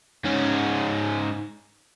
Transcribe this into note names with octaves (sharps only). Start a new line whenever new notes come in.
G#2 C#4